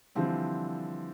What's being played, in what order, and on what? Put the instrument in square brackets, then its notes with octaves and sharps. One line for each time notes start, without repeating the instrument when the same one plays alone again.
[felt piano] D3 E3 F3 G3 C4